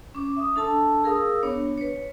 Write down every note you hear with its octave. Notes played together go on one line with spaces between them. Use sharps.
C#4 D6
E5 D#6
D4 A4 A5 E6
G#4 A#4 F5 D#6 E6
B3 D4 C#5
B4 C#5